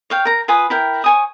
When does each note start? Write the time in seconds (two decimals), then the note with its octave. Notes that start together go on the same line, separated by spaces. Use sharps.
0.10 C#5 F5 G5
0.25 A#4 A#5
0.48 F4 B4 G#5 D#6
0.70 E4 A#4 G5
1.04 C#5 G#5 D#6